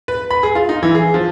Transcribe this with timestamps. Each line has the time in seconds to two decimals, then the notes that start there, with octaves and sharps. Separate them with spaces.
0.08 B4
0.31 B5
0.43 G#4
0.55 F4
0.69 D#4
0.83 E3
0.95 G#4
1.14 F3